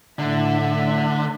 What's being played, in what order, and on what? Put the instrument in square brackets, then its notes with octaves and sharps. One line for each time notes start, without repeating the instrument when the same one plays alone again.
[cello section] A2 E5 [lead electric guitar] D3